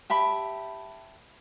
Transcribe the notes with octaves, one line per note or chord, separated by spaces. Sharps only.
G4 E5 A5 B5